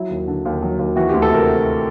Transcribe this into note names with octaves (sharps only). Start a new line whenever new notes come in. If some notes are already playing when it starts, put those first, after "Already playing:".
Already playing: F#3 E4
D#2
D3
D#2
F#3
D#2
E3 F#4
D2 G4
A4
C3 A#4